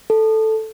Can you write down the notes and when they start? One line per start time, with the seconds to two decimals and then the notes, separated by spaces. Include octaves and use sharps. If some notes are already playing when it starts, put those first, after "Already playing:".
0.10 A4